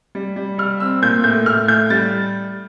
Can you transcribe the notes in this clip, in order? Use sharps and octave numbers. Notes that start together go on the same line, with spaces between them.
G3
G3
G3 F6
C4 E6
A#2 G6
A2 G6
A2 F6
A2 G6
G3 A6